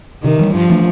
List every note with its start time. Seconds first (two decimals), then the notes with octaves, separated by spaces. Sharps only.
0.23 C3 D#3
0.39 E3 G3
0.54 G2 F3
0.70 E3 A3 D4